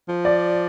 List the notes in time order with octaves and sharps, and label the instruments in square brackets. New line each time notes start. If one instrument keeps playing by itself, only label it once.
[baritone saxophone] F3
[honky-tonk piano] D5